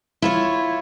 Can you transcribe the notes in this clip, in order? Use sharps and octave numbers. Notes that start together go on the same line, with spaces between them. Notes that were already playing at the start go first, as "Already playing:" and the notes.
E4 F4 C#5